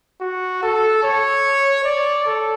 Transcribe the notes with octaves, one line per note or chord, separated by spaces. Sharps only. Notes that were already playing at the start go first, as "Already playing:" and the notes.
F#4
A4
C#5
D5
A4